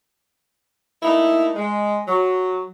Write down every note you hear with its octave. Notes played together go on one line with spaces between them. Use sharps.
A3 A#3 D#4 E4
G#3
F#3